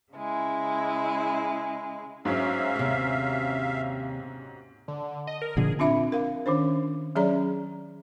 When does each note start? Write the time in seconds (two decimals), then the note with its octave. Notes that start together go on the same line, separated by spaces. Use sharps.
0.13 C#3 G#3 E4
2.25 G#2 F#3 C#4 E5 F5
2.76 D#2 C3
4.88 D3
5.27 D#5
5.42 A#4
5.57 A#2 D3 F3 G#4
5.79 C4 D4 F4 E5 B5
6.12 A#4 F5
6.46 D#3 C#4 D4 C5
7.16 F#3 C#4 G#4 C#5 D5 A#5